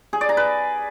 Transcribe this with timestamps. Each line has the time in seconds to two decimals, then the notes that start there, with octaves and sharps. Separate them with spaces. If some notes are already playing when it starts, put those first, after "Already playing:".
0.13 G#4
0.21 D5
0.29 A#5
0.37 B4